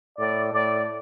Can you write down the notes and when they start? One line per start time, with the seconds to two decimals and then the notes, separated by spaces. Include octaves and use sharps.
0.18 A2 D5
0.52 A2 D5